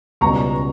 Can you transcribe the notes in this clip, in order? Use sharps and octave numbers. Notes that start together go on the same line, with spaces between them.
C#2 B2 G3 C#4 A#5 C#6